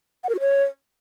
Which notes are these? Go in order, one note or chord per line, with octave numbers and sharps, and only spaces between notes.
F#5
A#4
F#4
C#5